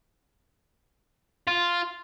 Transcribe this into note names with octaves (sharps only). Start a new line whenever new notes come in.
F4